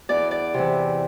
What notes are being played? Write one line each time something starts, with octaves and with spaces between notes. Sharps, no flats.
E2 D5
D5
C3 E3